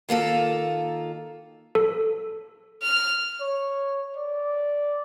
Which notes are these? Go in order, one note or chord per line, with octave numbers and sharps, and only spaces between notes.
D#3 A#3 F4 A4
A4
F6
C#5
D5